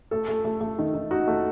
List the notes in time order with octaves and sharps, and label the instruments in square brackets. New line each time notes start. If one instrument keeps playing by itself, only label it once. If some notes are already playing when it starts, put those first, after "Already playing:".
[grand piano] A3 [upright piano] A4
[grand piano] A3
A3
A3
D#3
D#3
[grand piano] D#4 [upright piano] F#4
[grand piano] A3